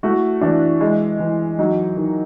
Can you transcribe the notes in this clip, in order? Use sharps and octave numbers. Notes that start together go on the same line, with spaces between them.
A3 E4 F#4
E3 D4 E4
G#3
E3
F#3 D#4
D#3